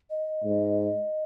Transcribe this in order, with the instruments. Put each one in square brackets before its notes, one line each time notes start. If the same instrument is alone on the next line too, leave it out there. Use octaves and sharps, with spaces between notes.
[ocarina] D#5
[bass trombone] G#2